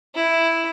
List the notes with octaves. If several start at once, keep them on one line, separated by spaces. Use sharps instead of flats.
E4